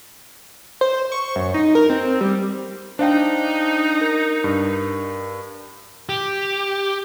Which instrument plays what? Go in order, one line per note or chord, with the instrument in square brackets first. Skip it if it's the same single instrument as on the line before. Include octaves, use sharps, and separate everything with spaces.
[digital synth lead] C5
C#6
F#2
D#4
A#4
C4
G3
[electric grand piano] D4 [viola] D#4 [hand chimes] C5 F5 G5
[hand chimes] A#4 A#6
[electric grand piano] G2
[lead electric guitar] G4